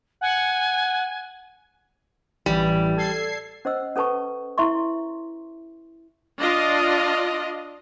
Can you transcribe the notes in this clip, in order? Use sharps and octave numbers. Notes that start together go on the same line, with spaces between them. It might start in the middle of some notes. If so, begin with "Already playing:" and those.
F#5 G#5
A1 E3 G3
A4 G#6 C7
C#4 C5 D#5 E6
C#4 A4 B4 A5 C#6
E4 E5 C6 C#6
D4 F4 D#5